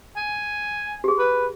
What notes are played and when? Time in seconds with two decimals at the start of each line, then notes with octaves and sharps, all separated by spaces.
0.16 G#5
1.04 G4 G#4
1.18 B4